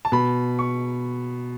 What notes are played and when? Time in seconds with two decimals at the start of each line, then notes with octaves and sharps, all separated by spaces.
0.05 A5
0.12 B2 B5
0.59 C#6